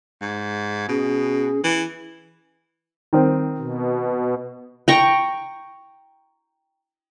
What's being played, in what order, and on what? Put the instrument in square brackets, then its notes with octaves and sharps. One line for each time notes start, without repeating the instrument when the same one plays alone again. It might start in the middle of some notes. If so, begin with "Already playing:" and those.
[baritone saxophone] G#2
[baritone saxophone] B2 [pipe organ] C#4 G#4
[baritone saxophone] E3
[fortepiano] D#3 C4
[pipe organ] B2
[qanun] G5 A#5 C#6